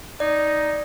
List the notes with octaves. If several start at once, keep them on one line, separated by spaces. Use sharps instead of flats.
D#4 D5